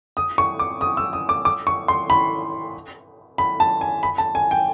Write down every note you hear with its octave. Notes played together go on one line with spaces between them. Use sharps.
D#6
C#6
D6
D#6
E6
D#6
D6
D6
C#6
C6
B5
B5
A5
G#5
B5
A5
G#5
G5